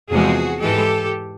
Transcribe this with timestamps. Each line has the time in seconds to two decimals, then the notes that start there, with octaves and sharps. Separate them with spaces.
0.11 E2 C3 F3 G#3 F#4 G#4
0.61 G#2 E3 G#3 G4 A4